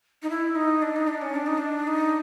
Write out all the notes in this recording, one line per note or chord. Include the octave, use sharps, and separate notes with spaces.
D#4
E4
D#4
D4
D#4
D4
C#4
D4
D#4
D4
D#4